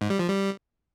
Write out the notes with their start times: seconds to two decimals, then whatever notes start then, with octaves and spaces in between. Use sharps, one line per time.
0.01 G#2
0.10 G3
0.19 F3
0.28 G3